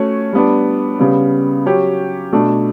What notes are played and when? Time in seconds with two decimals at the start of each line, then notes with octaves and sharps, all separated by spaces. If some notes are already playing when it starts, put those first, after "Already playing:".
Already playing: A3 C#4 F#4 C#5
0.33 G3 B3 D4
0.99 C#3 G3 B3
1.66 F#3 C#4 G4
2.32 B2 A3 D4